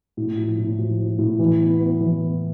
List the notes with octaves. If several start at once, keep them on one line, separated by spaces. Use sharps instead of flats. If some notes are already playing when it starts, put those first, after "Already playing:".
A2
F3
A2
F3
F3
A2
E3
B3
B3
E3
B3